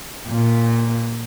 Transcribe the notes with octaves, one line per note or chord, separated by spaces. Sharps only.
A#2